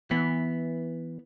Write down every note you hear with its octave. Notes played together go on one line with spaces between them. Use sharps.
E3 B3